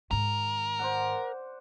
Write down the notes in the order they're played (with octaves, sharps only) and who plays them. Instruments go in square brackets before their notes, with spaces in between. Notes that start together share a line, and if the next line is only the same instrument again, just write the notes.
[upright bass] G#2 D#3 [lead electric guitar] A#4
[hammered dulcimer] C5 D5 F#5